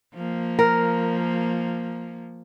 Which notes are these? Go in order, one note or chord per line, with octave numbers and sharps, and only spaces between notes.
F3 A#3
A#4